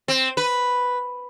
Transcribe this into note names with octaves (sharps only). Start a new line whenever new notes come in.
C4
B4